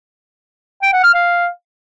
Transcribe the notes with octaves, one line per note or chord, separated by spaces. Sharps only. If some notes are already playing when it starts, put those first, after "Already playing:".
G5
F#5
F6
F5